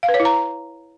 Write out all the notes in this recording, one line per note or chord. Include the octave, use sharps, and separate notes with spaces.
F5
B4
C#5
E4
A#5